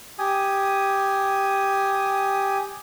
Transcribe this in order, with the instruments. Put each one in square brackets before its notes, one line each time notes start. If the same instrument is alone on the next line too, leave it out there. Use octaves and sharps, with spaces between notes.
[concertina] G4 G#5 D#6